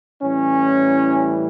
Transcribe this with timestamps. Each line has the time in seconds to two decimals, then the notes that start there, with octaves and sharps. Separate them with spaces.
0.22 A2 E3 G3 C#4